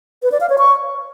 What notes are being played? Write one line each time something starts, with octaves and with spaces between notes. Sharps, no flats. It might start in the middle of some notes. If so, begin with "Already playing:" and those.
B4
D5
F5
C#5
C#6